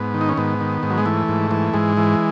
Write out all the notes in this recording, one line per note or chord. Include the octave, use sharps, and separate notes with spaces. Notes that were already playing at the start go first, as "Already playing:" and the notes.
Already playing: G#2 B3
D#3
D#4
C#4
G#2 B3
D#3
G#2
F#3
G#3
E3 A3
G#2
E3
G#2 G#3
E3